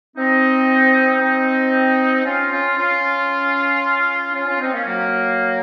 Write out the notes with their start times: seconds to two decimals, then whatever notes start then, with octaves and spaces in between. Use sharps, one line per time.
0.16 C4 D#4
1.20 C4 D#4
2.25 C#4 F4
2.51 C#4 F4
2.77 C#4 F4
4.33 C#4 F4
4.46 C#4 F4
4.59 C4 D#4
4.72 A#3 C#4
4.85 F#3 A#3